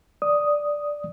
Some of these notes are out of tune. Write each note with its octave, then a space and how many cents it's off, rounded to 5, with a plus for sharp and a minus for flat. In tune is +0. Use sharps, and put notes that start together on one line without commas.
D5 +0 D#6 +0